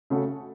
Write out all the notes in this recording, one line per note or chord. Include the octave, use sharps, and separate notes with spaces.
C#3 A3 C#4 F#4 A4